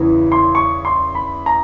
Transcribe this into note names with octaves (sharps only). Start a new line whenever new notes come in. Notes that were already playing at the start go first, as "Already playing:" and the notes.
Already playing: E2 C#3 E3
C6
C#6
C6
B5
A#5